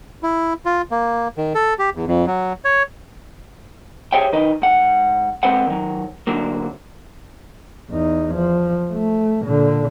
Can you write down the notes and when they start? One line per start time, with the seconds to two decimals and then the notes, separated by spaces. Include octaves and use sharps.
0.23 E4
0.66 F4
0.91 A#3
1.37 D#3
1.55 A4
1.79 G4
1.95 E2
2.07 F2
2.27 F#3
2.65 C#5
4.13 G4 G#4 C5 C#5 E5 G5
4.32 D#3 D#4 B4 D#5
4.62 G#2 F#5
5.43 G#3 C4 A4 B4 C5 F#5
5.67 D#3 F#3
6.27 D2 D3 F#3 A#3
7.90 E2 D#4
8.35 F3
8.92 A3
9.45 A#2 D3